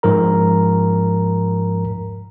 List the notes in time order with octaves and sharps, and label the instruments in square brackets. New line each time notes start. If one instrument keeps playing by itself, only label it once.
[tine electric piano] G#2 F3 A#4 A#5